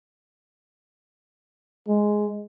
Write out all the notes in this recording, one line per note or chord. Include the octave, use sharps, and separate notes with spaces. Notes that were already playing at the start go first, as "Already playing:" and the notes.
G#3